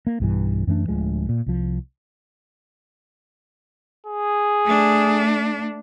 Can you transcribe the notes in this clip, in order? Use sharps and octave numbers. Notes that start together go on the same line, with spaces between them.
A#3
B1 G2 E3
F#2 E3 A3 D4
D1 D2 F3 G#3
A#2
C2 F3
G#4
A3 D4